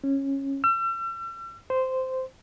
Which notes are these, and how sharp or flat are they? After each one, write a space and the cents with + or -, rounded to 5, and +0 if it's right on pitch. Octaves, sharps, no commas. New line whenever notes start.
C#4 -15
E6 +40
C5 -10